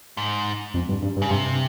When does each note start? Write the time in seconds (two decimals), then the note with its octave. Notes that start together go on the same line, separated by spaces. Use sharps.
0.17 G#2
0.74 F2
0.89 G2
1.02 G2
1.16 G2
1.22 C#3
1.30 G2 C3